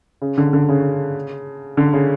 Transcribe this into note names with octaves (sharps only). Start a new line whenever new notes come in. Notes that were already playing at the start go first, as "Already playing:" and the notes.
C#3
D3
D3
C#3
D3
C#3